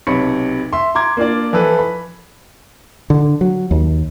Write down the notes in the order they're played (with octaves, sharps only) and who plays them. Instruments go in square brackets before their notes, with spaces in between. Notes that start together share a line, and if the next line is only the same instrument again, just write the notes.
[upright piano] B1 C3 C#5 B5 C#7
E5 C6
A#5 C6 D6 G#6
A#3 D4 F4 D5
E3 F3 A4 B4
B5
[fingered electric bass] D3
F#3
D#2